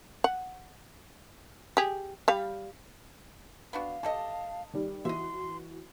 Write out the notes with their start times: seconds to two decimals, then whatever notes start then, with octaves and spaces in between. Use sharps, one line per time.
0.24 F#5
1.77 G4 G#4
2.28 G3 F5
3.73 B3 D4 F#4 F5
4.03 G4 A4 D#5 A5
4.73 D#3 G3
5.05 E3 F#4 D#5 E5 C6